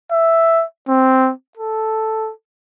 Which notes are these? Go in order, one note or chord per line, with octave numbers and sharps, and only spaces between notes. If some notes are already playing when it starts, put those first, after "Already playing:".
E5
C4
A4